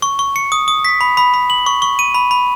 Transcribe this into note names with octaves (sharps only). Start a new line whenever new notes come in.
C#6
C#6
C#7
D#6
D#6
B6
B5
B5
B5
F#7
C#6
C#6
D#7
B5
B5